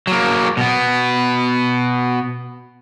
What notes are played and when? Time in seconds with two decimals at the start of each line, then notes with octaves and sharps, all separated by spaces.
0.07 F#3 A#3
0.57 B2 B3